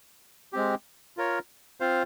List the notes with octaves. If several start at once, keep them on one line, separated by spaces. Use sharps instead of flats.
G#3 C4 G4
F4 A#4 C#5
C4 F4 C5 F5